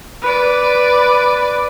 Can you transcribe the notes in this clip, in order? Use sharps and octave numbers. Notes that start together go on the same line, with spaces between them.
B4 D5